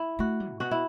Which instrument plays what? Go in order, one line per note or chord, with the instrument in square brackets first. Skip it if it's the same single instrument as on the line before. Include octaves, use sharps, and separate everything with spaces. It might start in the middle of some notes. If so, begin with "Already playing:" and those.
Already playing: [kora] E4
[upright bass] A3 [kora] F#4
[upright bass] G3
A2
[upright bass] B2 [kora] F#4
[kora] E4